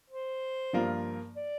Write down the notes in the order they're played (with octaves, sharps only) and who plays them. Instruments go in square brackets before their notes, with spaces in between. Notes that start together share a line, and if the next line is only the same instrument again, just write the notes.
[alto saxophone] C5
[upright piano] G2 F3 A#3 F4 A#4
[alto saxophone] D5